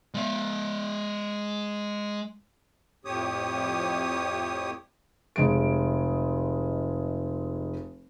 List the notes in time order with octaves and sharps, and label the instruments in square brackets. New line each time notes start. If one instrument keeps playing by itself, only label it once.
[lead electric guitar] G#3 E5
[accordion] F2 A2 G4 C#5 D#6
[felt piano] F1 G#3 D7